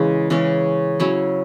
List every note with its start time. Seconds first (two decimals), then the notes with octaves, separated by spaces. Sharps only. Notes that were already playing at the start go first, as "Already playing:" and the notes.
Already playing: C#3 E3 G#3 C#4
0.30 C#3 E3 G#3 C#4
1.00 F#3 C#4 E4